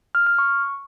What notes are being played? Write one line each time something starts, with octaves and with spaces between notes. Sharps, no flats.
F6
F6
C#6